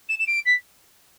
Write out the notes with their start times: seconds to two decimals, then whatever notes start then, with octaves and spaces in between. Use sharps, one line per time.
0.08 E7
0.19 E7
0.27 D7
0.45 B6